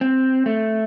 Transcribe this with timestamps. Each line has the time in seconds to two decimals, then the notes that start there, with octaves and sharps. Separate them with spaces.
0.01 C4
0.46 A3